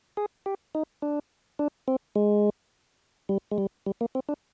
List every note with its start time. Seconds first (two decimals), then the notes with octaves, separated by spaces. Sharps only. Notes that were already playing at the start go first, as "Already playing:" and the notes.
0.17 G#4
0.46 G4
0.75 D#4
1.02 D4
1.59 D4
1.88 C4
2.16 G#3
3.29 G3
3.51 G#3
3.58 G3
3.86 G3
4.01 A#3
4.15 C4
4.29 D4